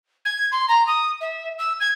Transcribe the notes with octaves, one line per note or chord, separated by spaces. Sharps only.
G#6
C6
A#5
D#6
E5
E6
G#6